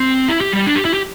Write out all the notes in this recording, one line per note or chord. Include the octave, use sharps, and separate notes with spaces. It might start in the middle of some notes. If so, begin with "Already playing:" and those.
Already playing: C4
E4
G4
G3
D4
G4
E4
G4